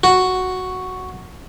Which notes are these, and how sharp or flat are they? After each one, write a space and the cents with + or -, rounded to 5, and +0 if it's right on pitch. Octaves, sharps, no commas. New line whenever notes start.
F#4 +0